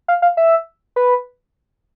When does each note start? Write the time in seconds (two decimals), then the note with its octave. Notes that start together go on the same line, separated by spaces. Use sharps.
0.08 F5
0.22 F5
0.37 E5
0.96 B4